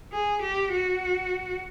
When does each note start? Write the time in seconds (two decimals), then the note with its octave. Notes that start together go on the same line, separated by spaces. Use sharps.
0.13 G#4
0.43 G4
0.73 F#4